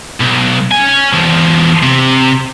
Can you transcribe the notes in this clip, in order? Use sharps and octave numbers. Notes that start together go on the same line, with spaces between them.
B1
C#4 G#5
E2 F3
C3